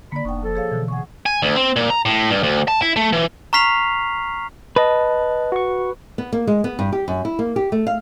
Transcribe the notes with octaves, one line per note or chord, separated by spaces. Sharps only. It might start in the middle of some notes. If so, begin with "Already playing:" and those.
D3 A#3 D5 B5
F1 G#2 B3 D4 G5 C#6
F3 A4
G#4 C#5 F5
B2 D3 E3
G#4 F#5 C#6
G#5
D2
C4
A#2
A#5
A2
G2
D2
A5
E4
A3
E3
A#5 C#6 F6 B6 C7 F7
B4 D#5 A5
F#4 C#6
B3
A#3
G#3
B3
G2
G4
F#2
E4
A#3
G4
A3
F5